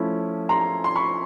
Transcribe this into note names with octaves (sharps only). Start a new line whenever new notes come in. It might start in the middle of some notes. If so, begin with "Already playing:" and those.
Already playing: F3 A3 C#4 E4
A#5 C6
C6
B5 C#6